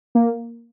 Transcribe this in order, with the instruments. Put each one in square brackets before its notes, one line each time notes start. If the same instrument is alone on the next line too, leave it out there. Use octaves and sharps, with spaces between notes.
[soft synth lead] A#3